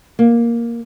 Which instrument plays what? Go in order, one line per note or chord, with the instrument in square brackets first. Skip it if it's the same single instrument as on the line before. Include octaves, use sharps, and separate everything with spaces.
[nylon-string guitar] A#3